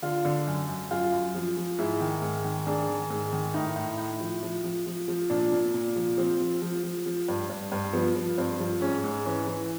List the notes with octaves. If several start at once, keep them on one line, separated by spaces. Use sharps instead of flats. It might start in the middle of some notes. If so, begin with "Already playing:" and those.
D3 F4
D3
F#2
F#2
F#2 F4
F#2
F3
F3
G#2 E4
D#3
G#2
D#3
G#2 D4
D#3
G#2
D#3
A2 D#4
A2
A2
F3
F3
F3
F3
F3
A#2 D4
A#2
A#2
F3
F3 C4
F3
F3
F3
F3
G2
G2
G2
F3 B3
F3
G2 C4
F3
G#2 C#4
G#2
E3 C#4
E3